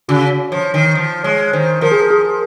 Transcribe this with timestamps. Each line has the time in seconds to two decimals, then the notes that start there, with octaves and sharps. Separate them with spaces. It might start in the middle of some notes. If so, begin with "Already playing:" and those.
0.09 C#3 F#4
0.52 F3 C#5
0.74 D#3
0.95 F3
1.24 G#3 C#5
1.53 D#3 C5
1.81 F3 A#4
1.92 G#4
2.00 A#4
2.11 G#4